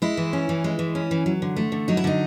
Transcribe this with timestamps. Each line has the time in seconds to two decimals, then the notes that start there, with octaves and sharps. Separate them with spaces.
0.02 G#3 E4
0.17 E3
0.33 C#4
0.49 E3
0.64 G#3
0.79 E3
0.95 C#4
1.11 E3
1.26 F#3
1.42 D3
1.56 A3
1.72 D3
1.88 F#3 D#4
1.97 E4
2.04 D3 D#4